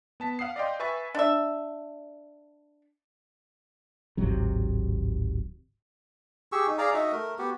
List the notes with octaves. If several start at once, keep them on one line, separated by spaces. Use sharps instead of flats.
B3 A5 B6
F5 F#5 D#6 C7
D5 D#5 F5 G5 C6
B4 E5 G#5 C#6 A6
D4 E5
D1 G#1 C3 F#3
G4 G#4 C#6 E6
D#4
G#4 D5 F5 A#5
D#4 F#4 D#5 E5
A3 A#4
B3 F#4 G4